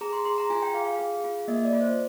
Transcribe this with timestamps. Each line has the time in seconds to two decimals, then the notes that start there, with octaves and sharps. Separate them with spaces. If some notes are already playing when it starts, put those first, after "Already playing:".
0.01 G#4 A#5
0.13 C6
0.25 G#4 C6
0.38 A#5
0.50 F4 G#5
0.62 G5
0.74 G#4 F5
0.86 F5
0.99 G#4
1.24 F4
1.48 A#3 D#5
1.65 D5
1.73 F4
1.80 C5